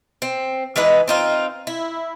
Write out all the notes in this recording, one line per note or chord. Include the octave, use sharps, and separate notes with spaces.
C4
E3 G#3 D#4 B4
C4 D#4 F4
E4